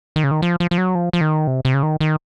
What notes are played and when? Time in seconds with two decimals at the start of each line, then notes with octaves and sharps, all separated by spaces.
0.16 D#3
0.24 C#3
0.31 D#3
0.42 F3
0.60 F3
0.71 F3
0.78 F#3
0.95 F3
1.13 F3
1.21 D#3
1.47 C3
1.65 C3
1.74 C#3
1.83 D#3
2.01 D#3